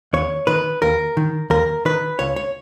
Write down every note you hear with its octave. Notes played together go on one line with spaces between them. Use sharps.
D#2 C#5
D#3 B4
D#2 A#4
D#3
D#2 A#4
D#3 B4
C#2 C#5
C#5